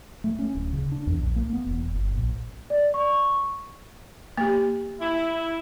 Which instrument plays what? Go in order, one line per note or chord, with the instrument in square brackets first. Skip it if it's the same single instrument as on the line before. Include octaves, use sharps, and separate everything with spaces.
[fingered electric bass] A3
C#4
D1
C#3
D4
E2
A#1
A#3
B3
E1
G1
A#1
[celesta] D5
C#6
[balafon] A#3 G4
[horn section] E4